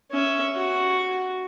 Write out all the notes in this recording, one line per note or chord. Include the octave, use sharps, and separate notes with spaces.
C#4 E5
F#4